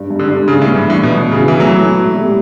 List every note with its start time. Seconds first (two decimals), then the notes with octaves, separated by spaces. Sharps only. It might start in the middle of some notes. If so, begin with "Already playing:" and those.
Already playing: G2
0.10 G2
0.19 D3
0.28 G2
0.47 G2 C#3
0.62 A2
0.66 B3
0.75 G2
0.85 A2 E3
1.03 B2 F#3
1.23 B2
1.31 C#3
1.41 E4
1.48 E3
1.60 F#3 A3
1.78 E4
1.98 B2
2.16 G3